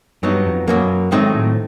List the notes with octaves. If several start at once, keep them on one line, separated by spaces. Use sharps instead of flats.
G2 F#3 B3 D#4
F2
F#2 B2 F#3 A#3
G#2 D#3 F#3 A3 C4 D#4
A2